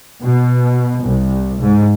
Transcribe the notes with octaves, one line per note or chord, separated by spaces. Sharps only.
B2
C2
G#2